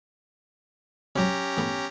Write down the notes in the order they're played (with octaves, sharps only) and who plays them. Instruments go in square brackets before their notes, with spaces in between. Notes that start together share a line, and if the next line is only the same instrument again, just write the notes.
[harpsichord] C3 F#3 [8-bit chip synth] C#4 G4 A#5
[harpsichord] E3 A3 B3